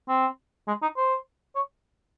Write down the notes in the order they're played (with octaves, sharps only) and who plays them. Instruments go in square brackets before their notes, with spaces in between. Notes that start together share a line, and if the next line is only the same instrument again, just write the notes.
[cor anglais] C4
G#3
D#4
C5
C#5